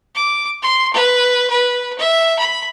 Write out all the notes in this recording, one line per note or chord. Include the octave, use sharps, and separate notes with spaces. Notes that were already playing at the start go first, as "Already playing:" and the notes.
D6
C6
B4
B4
E5
B5